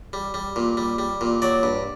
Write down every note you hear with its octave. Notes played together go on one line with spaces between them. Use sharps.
G3
G3
A#2
G3
G3
A#2
F#3 D5
G2